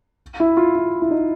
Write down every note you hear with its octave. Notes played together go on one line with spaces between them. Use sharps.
E4
F4
E4
E4
D#4